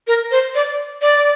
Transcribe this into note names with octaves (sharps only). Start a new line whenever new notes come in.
A#4
C5
D5
D5